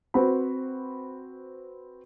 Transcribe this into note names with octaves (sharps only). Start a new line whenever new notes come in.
C4 F#4 B4 C5 B5